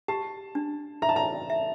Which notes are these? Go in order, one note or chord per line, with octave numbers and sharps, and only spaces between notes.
G4 A5
D4
E5 A#5
A5
A#5
E5